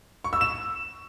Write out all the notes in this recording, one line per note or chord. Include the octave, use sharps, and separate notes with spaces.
C#6
E6
E7